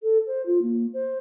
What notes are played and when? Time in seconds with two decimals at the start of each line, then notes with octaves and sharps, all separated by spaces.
0.03 A4
0.27 C5
0.46 F4
0.62 A#3
0.94 C5